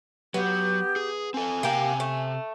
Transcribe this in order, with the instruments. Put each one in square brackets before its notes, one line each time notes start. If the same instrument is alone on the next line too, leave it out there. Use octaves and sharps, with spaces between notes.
[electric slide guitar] F#3 [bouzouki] B3 [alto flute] G4
[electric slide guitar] G#4
[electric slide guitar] C4 A4 [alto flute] G#5
[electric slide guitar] C3 A#5 [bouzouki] A#3 G4
[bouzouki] A3